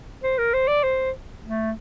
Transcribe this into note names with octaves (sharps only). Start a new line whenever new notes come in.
C5
A#4
C5
D5
C5
A3